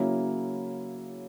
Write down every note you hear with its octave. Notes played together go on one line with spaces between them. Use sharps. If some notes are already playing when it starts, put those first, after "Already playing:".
Already playing: C#3 F#3 A#3 C#4 E4